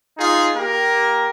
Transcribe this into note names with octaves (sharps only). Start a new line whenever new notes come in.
D#4 F4 G#4
A#3 G4 A#4